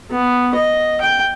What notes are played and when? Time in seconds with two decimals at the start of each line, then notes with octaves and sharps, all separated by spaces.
0.11 B3
0.54 D#5
1.01 G5